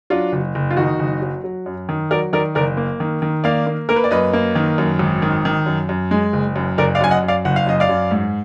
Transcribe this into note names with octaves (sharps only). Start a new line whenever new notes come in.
F#3 D4 F4
F#1
F#1
F4
D#3 D#4 F#4
F#1
F#3
F#3
F#2
D#3
F#3 A#4 D5
D#3 A#4 D5
F#1 A#4 D5
A#3
D#3
D#3
A#3 D5 F5
A#3
A#3 A#4
B4
D5
F#2 B4 D#5
A#3
D#3
F#2
G#1
D#3
D#3
F#2
F#2
G#3
F#1
F#2
F#1 A#4 D5
D5 F5
F#2 G#5
D#5 F#5
F#2
D5 F5
F#1 F#5
F5
F#2 D#5
D5 F5
F#2
G#2